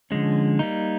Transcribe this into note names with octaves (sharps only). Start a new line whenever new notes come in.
D3 F3 G#3 C#4
G3 A#3 D#4